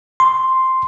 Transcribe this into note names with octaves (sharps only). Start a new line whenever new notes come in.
C6